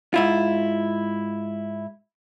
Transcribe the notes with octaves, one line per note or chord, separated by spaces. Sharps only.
G#2 E4 F4